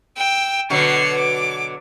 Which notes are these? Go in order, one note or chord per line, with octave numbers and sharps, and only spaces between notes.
G5 E6
B2 D3 F#3 C7 C#7
D6